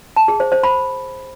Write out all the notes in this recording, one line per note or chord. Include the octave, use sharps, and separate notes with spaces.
A5
G#4
C5
C5
B5